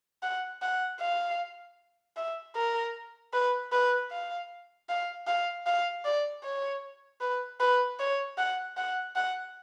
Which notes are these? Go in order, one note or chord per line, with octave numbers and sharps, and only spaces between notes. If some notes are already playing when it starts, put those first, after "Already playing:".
F#5
F#5
F5
E5
A#4
B4
B4
F5
F5
F5
F5
D5
C#5
B4
B4
C#5
F#5
F#5
F#5